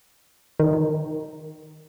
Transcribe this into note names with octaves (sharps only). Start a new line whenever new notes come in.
D#3